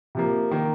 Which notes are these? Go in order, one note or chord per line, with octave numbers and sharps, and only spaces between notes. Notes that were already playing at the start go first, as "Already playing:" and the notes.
C3 F3 A#3
D#3 A#3